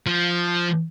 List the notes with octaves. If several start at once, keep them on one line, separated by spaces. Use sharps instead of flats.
F3